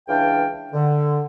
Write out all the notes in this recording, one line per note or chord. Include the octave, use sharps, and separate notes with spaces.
C#2 E3 D4 F5 G5
D3